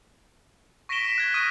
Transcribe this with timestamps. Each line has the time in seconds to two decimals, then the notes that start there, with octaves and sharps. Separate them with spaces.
0.89 C#6 A#6 B6 D7 E7 G7
1.04 A#6 B6
1.18 F#6 G#6
1.34 C#6 D#6 F6 G#6 A#6 D#7